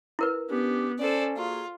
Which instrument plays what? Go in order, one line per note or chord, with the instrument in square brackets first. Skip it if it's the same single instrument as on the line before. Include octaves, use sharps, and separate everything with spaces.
[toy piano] E4 A#4 B4
[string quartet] B3 [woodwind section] C#4 D4 G4
[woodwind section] C#4 [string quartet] A4 C5 D5
[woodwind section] A#3 F#4 G#4 [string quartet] F4